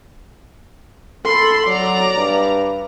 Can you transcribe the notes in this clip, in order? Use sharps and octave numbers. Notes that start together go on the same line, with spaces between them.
A4 B5 C6
F#3 D5 A#5
G2